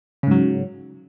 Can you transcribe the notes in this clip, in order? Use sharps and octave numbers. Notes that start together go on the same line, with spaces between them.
G#2 C#3 F#3